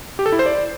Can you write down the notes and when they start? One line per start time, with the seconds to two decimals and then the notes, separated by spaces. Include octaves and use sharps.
0.19 G4
0.26 A4
0.32 E4
0.39 C5
0.46 D5